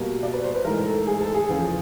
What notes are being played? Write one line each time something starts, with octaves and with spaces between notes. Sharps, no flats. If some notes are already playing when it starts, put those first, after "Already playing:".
Already playing: B2 G3 A#3
D5
B4
C5
B4
G#2 E3 A3 A#4
A4
G#4
A4
G#4
E2 C#3 F3